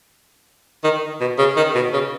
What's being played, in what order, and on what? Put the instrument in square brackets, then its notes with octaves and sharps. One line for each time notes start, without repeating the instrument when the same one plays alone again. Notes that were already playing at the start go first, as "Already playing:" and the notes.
[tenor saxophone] D#3
B2
C#3
D#3
B2
C#3